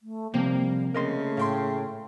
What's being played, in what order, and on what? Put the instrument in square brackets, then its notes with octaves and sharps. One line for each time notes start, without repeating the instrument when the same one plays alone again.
[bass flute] A3
[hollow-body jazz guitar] C3 F3 C4 [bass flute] G3 [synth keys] A#3
[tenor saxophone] C#3 [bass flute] A3 [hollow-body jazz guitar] A#4 D#5 C6
[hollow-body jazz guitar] A2 [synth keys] F5 G5 C6